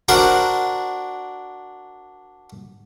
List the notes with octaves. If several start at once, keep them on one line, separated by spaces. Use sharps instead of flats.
D4 F#4 A#4 C5 D5